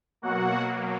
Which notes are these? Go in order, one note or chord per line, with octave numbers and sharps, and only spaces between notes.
B2 F#3 A#3 F#4 F#5